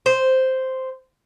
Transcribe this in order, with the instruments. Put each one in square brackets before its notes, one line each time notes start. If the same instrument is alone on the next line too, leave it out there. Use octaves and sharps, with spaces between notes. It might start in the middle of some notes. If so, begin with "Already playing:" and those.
[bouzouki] C5